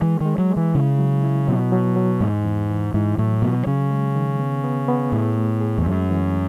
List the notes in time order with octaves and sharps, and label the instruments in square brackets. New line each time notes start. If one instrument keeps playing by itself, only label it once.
[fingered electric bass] E3 [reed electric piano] G#3
[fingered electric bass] D#3
[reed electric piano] G#3
[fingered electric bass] F#3
[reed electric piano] G#3
[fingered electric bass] E3
[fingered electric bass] C#3 [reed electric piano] E4
[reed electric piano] F#3
E4
[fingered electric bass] B2 [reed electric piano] F#3
[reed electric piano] F#3
F#3
[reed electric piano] E2 [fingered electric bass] G#2
[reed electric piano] E2
E3
[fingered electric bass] G#2 [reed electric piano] E4
[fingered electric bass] A2 [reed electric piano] F#3
[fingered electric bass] B2 [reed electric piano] F#3
[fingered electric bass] C#3 [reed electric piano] C#4
[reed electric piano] G#3
D#3
B3
B3
B3
[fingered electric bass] A2 [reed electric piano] G#4
[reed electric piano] A3
G#4
[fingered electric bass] E2
[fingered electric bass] F#2 [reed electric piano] G#3
[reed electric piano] E3